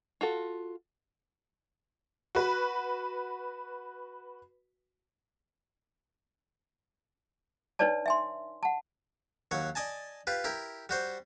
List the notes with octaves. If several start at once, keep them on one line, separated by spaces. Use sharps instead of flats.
F4 F#4 A4
F#4 B4
D4 D#4 B4 C#5 D5 A5
E5 G#5 C6
F#5 A5
D#2 F#3 C#5
D5 D#5 G#5 A5
F4 G4 B4
E4 G4 A#4
G3 F#4 C5